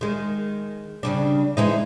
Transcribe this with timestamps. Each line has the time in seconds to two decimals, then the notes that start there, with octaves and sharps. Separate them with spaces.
0.01 D#3 G#3
1.03 C#3 G3 D4
1.57 E3 G#3 D#4